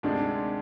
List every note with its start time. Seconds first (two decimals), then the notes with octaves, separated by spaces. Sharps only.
0.03 D2 C3 D#3 G#3 D4